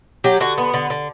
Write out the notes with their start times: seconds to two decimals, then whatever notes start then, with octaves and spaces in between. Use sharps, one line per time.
0.24 F#3 G4
0.40 D3 F#4
0.58 B3
0.74 D3
0.90 D3